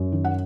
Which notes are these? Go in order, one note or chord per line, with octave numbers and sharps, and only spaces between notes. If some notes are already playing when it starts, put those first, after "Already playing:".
Already playing: F#2
D#3
F#5